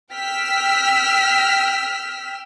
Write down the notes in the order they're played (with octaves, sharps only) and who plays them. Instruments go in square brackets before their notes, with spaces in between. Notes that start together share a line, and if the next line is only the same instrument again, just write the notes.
[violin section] G5 E6 F6 B6